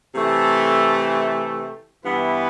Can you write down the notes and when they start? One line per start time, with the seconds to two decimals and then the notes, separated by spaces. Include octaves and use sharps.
0.15 C3 E3 A3
2.04 G2 E3 B3 E4 B4